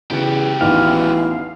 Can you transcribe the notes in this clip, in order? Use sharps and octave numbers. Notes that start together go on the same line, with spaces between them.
E2 C#3 F#3 G4
A1 E2 D#3 E3 F5